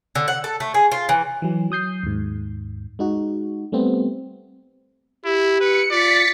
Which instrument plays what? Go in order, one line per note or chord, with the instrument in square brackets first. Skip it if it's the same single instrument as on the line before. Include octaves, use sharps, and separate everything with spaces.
[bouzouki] D3
F#5
A4
A3
G#4
F4
E3
[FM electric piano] E3 F#3
F#3 D#6 G6 C7
D#2 G#2
G#3 D#4 F#4
G3 A3 B3 C4
[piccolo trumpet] E4 [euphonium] G4
[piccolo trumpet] B4 [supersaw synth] C#7
[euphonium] F4 [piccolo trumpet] D5 [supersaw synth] A6 B6 C#7